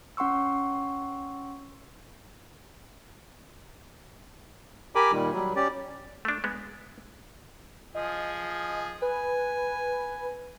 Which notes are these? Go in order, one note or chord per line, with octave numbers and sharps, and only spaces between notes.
C#4 F#5 C6 C#6 E6
G4 A#4 G#5 B5 D6
A#2 D#3 G3
F#3 G3
C#4 G4 D5
A3 D4
G#3 B3
F3 G#4 D#5
B4 G#5